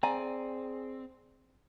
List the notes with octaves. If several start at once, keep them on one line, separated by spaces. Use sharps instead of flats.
C4 G#4 D5 G#5 A#5